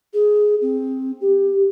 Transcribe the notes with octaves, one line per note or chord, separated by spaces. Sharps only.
G#4
C4
G4